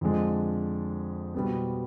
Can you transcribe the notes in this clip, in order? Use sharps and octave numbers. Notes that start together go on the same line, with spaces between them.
F2 D3 G#3 D4
B2 G3 B3